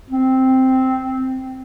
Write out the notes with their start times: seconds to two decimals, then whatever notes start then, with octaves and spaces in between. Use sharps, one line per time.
0.10 C4